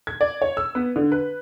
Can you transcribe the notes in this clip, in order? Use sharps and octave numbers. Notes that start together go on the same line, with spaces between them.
G#6
D5
C#5
E6
B3
D3
B4